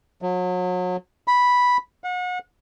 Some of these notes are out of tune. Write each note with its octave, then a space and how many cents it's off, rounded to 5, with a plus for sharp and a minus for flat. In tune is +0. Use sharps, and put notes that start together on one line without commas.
F#3 -35
B5 -5
F#5 -35